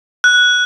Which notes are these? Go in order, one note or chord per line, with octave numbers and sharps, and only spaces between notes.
F#6